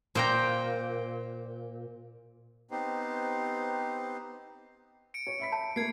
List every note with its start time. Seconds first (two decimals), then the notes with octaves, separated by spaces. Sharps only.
0.15 A#2 C5 G5 A#5
2.71 B3 C4 D#4 G4 C5
5.14 C#7 D7
5.27 C#5
5.40 E5 B5 B6
5.52 A5
5.76 A3 A#3 G#6 C7